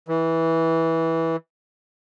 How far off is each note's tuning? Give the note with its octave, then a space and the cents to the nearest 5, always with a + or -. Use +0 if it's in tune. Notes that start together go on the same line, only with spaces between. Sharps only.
E3 -15